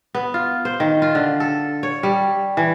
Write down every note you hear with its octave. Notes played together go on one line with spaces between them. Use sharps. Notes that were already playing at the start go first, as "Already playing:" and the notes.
B3
F4
C5
D#3
F4
D3
A4
C#5
G3
E3